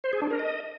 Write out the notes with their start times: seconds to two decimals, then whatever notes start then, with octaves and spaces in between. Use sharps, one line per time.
0.04 C5
0.13 G#4
0.22 D4
0.31 A#4
0.39 D#5